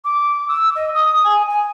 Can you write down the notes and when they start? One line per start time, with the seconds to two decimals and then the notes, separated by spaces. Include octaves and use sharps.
0.05 D6
0.48 E6
0.76 D#5
0.95 D#6
1.24 G#5
1.50 G#5